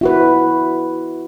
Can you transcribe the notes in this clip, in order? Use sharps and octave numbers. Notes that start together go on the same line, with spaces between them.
E4 F#4 B4